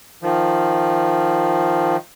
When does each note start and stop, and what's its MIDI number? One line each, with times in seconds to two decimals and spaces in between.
0.23 1.97 51
0.23 1.97 53